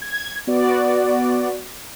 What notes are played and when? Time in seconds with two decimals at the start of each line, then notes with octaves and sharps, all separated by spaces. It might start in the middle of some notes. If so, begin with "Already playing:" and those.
0.02 G#6
0.47 B3 F#4 D5